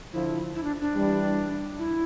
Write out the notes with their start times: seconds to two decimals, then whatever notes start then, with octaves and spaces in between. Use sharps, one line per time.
0.13 D3 F3 E4
0.55 E4
0.63 D4
0.81 D4
0.96 E3 G3
1.79 E4